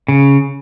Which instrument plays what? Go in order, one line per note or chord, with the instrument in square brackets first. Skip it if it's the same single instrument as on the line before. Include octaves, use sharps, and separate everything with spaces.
[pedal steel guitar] C#3